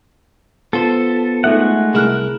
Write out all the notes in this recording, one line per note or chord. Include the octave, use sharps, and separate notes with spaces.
B3 F4 A4 C5
G#3 A3 D#4 A4 E5 F#5
C2 E4 G#4 A#4 F6 F#6